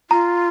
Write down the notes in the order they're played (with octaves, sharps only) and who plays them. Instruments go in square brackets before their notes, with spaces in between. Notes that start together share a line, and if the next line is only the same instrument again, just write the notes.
[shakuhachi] F4 [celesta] A#5